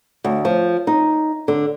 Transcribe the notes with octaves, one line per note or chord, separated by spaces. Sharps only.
D2
F3
D#4
D3